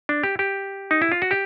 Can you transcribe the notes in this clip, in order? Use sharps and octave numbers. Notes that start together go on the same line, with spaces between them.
D4
G4
G4
D#4
E4
F4
F#4
G4